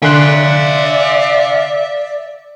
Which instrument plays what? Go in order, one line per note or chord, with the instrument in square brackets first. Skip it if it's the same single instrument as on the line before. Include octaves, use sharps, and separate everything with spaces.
[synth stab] D3 C6 F#6 [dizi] D5 [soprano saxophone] E5 [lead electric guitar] F5 G#5